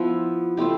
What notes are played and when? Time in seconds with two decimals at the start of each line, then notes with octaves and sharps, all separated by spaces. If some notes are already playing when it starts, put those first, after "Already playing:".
Already playing: F3 B3 E4
0.57 A3 C4 E4 G4